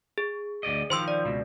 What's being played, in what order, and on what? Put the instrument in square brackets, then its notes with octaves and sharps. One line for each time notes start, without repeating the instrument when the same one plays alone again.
[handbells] G#4
[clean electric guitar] D2 D5 D#5
[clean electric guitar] D#3 F3 [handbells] C5 C6 E6
[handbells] D5
[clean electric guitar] C#2 B2